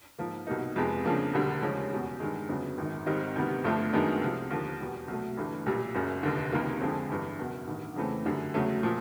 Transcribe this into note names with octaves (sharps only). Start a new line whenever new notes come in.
G#2 F3 A#3
C2 B2 G3 A#3 D#4
F2 C3 F3 G#3 B3
F2 C#3 F3 A#3 D4
E1 D2 D3 G3
D#2 C#3 F3 G#3 C#4
E2 B2 G3
G2 D#3 G#3
G1 F2 C#3 F#3 B3
G#1 F#2 D#3
G#2 D#3 G3 C4 D#4
D2 C3 D#3 G3 B3
G1 G2 D3 F3 A3
F#2 D#3 G#3 B3 D4
C2 C3 F3
D#2 D3 F3 A#3
E2 B2 G3
C2 B2 F#3 A3
G1 G2 E3 A3
B1 A#2 G3
F#1 F#2 C#3
F1 D#2 D3
C#2 C3 D#3 G3 A#3
F2 D3 F3 G#3 C4
G1 G2 E3
F#1 E2 B2
A1 G2 D#3
F2 C#3 E3 A3 C4
F#2 D3 G3
E2 C#3 F#3 A3
A#2 F3